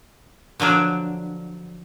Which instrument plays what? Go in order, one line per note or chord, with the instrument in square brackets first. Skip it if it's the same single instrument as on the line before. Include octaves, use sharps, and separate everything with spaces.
[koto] D3 F3 F#3 D4